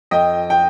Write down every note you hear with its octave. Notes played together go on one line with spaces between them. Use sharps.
F2 D#5 G5
G5